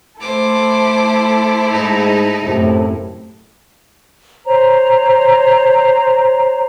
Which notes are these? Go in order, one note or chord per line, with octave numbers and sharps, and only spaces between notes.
A3 E4 A4 C5 D6
G#2 D#4
F#2 A2 C3 A3
C5 C#5 A#5